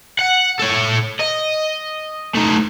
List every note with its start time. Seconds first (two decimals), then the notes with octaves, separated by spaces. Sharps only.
0.19 F#5
0.59 A4 C#5
1.19 D#5
2.35 A3 D#4